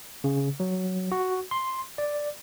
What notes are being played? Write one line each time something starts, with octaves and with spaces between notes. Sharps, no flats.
C#3
F#3
F#4
C6
D5